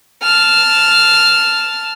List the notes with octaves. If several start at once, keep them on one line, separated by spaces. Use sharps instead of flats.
A5 F6